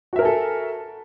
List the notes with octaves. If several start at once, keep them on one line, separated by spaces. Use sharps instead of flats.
F#4 A4 A#4 E5 G#5